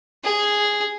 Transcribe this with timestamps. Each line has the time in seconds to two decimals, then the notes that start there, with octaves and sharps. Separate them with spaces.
0.24 G#4